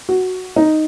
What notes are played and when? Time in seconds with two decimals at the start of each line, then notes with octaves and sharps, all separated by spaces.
0.09 F#4
0.56 D#4